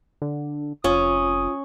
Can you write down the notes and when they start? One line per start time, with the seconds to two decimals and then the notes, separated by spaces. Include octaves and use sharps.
0.22 D3
0.84 F1 C#4 F4 D#6